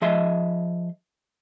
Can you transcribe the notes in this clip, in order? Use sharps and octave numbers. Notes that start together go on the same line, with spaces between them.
F3 G#4 D#5 E5 C6